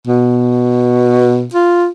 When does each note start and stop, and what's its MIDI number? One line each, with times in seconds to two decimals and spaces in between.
0.08 1.47 47
1.54 1.87 65